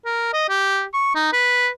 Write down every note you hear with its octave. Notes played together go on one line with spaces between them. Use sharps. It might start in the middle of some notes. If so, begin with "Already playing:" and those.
A#4
D#5
G4
C#6
D#4
B4